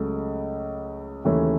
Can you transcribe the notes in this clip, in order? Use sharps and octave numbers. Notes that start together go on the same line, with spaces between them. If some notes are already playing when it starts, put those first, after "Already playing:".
Already playing: C#2 C#3 F#3 A3 C#4
D#2 C#3 E3 A3 C#4